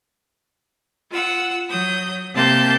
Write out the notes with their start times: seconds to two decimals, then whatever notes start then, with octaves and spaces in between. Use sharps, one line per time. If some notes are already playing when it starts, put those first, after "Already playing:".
1.12 F4 F#5 E6
1.71 F#3 D#6 G6
2.35 C3 A#3 A5 C6 G6